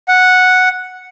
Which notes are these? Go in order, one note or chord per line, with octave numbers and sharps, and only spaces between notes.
F#5